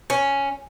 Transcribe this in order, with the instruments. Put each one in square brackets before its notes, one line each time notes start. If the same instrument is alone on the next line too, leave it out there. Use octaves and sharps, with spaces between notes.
[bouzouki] C#4